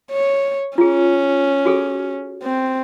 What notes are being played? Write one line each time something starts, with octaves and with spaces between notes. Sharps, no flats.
C#5
C#4 F4 G#4
F#4 G#4 A4
C4